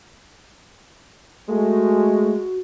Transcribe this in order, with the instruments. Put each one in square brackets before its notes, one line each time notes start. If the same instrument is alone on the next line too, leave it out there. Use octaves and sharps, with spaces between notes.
[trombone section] G#3 A3 [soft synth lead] F#4